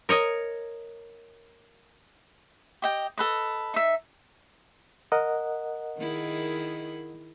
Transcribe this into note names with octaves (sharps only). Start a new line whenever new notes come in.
A#4 C#5 D#5
G4 D#5 G5
A4 B4 D#5
D#4 E5
A#4 D#5 F#5
D#3 E4 G#4